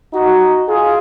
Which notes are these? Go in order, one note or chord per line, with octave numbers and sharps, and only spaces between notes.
D#4 F#4
F4 G#4